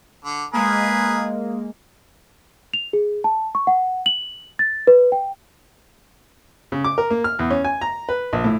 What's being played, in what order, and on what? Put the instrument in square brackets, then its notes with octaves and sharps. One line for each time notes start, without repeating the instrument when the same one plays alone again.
[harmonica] D3
[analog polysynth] G#3 A#3 [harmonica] G#4 A#4 B4
[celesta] F7
G#4
A5
C#6
F#5
F#7
A6
B4
G5
[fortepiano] C#3
D6
A#4
A#3
F6
E2
C#4
G#5
A#5
B4
A#1
A2